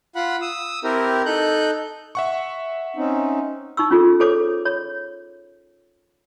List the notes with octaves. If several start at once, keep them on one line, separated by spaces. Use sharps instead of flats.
F4 F#5 B5
D#6 E6
C4 E4 G4 A#4
D#4 A4 F#6 G6
E5 F#5 C#6
C4 C#4 D#4
D#4 C#6 E6
C#4 F4 G#4 A4
G#4 A4 C5 C#5 D6
C#5